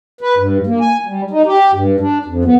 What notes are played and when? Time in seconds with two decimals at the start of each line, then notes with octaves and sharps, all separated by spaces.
0.21 B4
0.37 G2
0.67 A#3
0.80 G#5
1.06 G3
1.31 D#4
1.46 G4
1.74 G2
2.00 D4
2.25 F2
2.45 B3